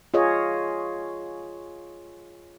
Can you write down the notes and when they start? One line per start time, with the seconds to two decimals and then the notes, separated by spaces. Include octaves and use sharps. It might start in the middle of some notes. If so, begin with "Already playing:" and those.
0.14 F4 G#4 C#5 D#5